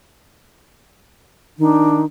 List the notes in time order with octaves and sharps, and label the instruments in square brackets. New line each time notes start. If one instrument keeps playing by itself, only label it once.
[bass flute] D#3 [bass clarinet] D4